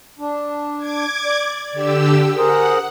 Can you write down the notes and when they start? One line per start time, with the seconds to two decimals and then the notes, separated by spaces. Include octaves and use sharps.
0.19 D4
0.78 D6 G#6
1.25 D5
1.72 D3 G4 E6
2.38 G#4 A#4 C5 F#5